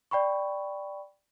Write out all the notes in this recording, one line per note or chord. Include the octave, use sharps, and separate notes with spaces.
D5 G5 B5 C#6